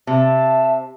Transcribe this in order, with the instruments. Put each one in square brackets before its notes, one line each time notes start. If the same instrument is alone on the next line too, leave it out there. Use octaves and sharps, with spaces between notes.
[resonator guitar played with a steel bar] C3 [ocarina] E5 [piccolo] A5